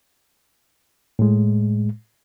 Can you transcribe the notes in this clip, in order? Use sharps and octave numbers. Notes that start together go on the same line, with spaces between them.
A2 G#3